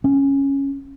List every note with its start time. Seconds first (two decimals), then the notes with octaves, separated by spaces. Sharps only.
0.04 C#4